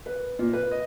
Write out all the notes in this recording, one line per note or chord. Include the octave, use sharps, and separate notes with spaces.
B4
A#2
B4
D#5